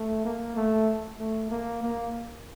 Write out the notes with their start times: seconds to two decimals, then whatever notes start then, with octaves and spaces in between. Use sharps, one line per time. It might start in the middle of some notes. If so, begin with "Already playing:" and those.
Already playing: A3
0.25 A#3
0.56 A3
1.20 A3
1.50 A#3
1.82 A#3